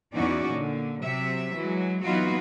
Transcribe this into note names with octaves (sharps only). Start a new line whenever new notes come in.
E2 E3 C#4 D#4 F#4 D5
A#2 D3
C3 F#3 E5
E3 F#3 G#3
E3 F#3 B3 D#4 F4 F#4